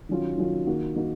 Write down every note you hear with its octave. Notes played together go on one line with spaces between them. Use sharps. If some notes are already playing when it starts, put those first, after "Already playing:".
D#3 F#3 C#4 F4
D#3 F#3 C#4 F4
D#3 A#3 D#4 F#4
D#3 A#3 D#4 F#4